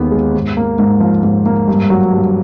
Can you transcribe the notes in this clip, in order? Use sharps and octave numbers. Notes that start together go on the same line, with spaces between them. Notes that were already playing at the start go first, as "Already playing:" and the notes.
Already playing: D#2 D#3 G#3 B3 F#5
G#3
G#2
A#3
G#2
F3 F5
G#2
A#3
G2
F#3
G2